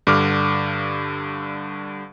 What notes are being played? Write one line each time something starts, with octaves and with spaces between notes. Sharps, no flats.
G2 D3 D6 F6